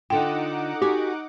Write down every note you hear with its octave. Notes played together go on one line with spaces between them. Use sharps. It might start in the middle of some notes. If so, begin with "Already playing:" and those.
D3 D#4 F4 F#5 G5 D6
F#4 G4 G#5